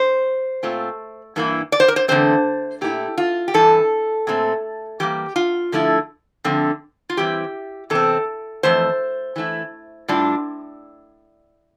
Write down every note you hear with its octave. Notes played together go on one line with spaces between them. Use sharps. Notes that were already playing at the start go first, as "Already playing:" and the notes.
Already playing: C5
A#2 A3 C4 F4
G2 E3 A#3 E4
D5
C5
A#4
C5
E2 D3 F3 A3 C4 C5
A#2 A3 E4 G4
F4
G4
G2 E3 A4
A#2 A3 C4
E3 G3 A#3 G4
F4
D3 F3 A3 E4
D3 F3 A3 C4
F4
E3 G3 C4 E4 G4
E2 C3 C4 A4
F2 E3 A3 C5
E3 A3 E4
A2 G3 D4 F4